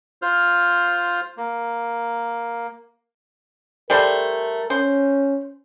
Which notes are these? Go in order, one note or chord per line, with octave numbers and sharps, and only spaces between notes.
F4 C5 F6
A#3
G3 A3 A#4 C5
C#4 C5